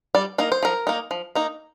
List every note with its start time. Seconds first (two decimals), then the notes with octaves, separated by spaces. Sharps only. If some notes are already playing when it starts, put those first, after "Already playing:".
0.15 G3 D5
0.38 A#3 D#4 A#4
0.52 C5
0.63 F3 A#4
0.87 A#3 D#4
1.11 F3
1.35 A#3 D#4